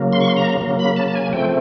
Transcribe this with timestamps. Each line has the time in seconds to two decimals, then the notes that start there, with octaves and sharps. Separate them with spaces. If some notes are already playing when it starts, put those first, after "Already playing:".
Already playing: C#3 F#3 A#3
0.13 C6
0.20 C#6
0.28 C6
0.36 A#5
0.61 C#3 F#3 A#3
0.79 B5
0.96 A5
1.08 A5
1.15 G#5
1.33 C#3 F3 A3 C4 G5